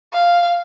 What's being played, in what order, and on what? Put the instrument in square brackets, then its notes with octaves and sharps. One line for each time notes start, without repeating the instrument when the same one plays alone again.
[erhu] F5